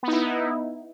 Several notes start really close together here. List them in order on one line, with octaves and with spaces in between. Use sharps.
B3 D#4 E4